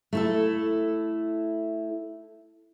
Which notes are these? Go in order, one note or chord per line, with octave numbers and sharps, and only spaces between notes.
A3 E4 A4